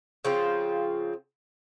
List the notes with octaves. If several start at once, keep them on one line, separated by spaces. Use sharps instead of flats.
C#3 F3 C4 F4